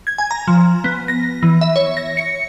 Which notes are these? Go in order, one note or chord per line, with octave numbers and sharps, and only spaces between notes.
G#6
G#5
A#5
F3
B3
A#6
E3
E5
C#5
A#6
C#7